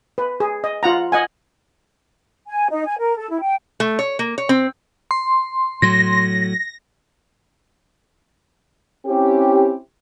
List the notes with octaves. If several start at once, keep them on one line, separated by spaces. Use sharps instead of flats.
B4
G#4
D#5
F4 F#5 A#5
D#5 F#5 G#5
G#5
D#4
G#5
A#4
A4
E4
G5
A3
C#5
A#3
C#5
C4
C6
A2 F#3 A#6
C4 C#4 E4 G4